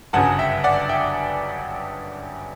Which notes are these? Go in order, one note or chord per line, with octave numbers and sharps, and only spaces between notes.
G1 F#2 C#3 F#3 F#5 A5
E5 G5
D5 F#5
E5 G5